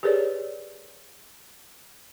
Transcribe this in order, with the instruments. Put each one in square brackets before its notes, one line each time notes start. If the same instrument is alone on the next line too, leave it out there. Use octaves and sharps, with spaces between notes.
[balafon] G4 G#4 A#4 B4 C#5 D5